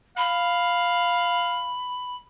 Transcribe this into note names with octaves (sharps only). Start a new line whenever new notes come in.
F5 B5